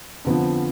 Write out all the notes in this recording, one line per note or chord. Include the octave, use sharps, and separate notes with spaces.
F2 D3 F3 B3